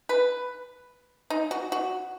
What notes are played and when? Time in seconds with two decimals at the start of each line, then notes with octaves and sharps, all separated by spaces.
0.09 B4
1.30 D#4
1.51 F#4
1.72 F#4